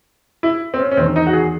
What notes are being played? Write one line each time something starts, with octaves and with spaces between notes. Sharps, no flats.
E4
C4
C#4
C#4
E2 D#3 C4
D#4
F#4
G#4